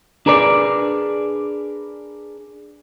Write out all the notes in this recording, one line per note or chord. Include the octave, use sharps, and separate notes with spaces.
D4 G#4 A#4 B4 D5